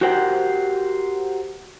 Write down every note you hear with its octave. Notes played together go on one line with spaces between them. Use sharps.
F#4 G4 A#4 C5 F#5 G5